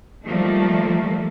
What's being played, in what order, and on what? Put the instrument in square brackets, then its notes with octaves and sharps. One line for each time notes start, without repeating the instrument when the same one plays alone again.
[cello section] D#3 F3 G3 A3 A#3